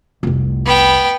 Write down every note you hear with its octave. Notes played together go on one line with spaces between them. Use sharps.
F1 C2
B3 G5